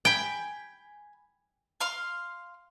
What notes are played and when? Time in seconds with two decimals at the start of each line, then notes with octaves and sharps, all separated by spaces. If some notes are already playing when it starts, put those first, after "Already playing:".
0.05 G5 G#5 B5
1.80 F5 C6 F6